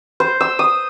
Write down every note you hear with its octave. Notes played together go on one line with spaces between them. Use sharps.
C5
E6
D#6